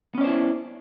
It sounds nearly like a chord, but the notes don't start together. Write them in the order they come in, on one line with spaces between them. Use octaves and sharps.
B3 C#4 D5 C5 E4